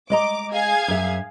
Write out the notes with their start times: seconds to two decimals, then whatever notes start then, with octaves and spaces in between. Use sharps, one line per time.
0.10 G#3 D#5 A#5 D6
0.52 G#4 F5 G#6
0.88 F#2 E5